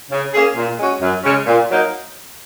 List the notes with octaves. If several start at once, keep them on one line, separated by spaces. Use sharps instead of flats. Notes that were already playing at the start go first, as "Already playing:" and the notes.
C#3
A#3 C#4 G#4
A#2
G#3 C#4 F#4
F#2
C#3 G#3 C#4
A#2
F#3 A#3 D#4